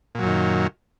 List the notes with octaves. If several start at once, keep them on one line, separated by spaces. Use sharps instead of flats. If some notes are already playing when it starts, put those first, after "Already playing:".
F#2 A#2 D#3 F#3